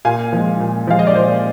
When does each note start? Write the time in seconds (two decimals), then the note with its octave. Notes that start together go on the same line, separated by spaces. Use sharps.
0.05 A#2 F5 G#5
0.33 F3 G#3
0.60 A#2
0.87 F3 G#3 F5
0.99 D#5
1.07 D5
1.15 A#2 C5